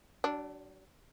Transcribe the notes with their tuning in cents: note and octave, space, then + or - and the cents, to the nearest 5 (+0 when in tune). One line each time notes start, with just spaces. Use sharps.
F#3 +40 D4 +0